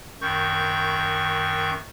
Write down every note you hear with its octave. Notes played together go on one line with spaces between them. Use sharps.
F#2 D#3 C#6 G6